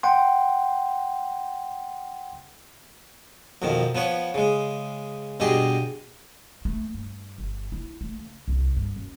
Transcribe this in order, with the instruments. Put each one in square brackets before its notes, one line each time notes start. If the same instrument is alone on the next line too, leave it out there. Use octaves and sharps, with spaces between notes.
[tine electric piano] F#5 G5 C6
[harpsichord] F2 B2 D#3 F3
F3 B3 B4 C#5
C#3 G#3
G2 B2 G4 G#4 D#5 C6
[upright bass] A3
G2
G1
E4
A3
C#3
C2
G2
F#2